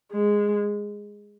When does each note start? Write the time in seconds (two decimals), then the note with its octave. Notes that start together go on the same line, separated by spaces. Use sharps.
0.12 G#3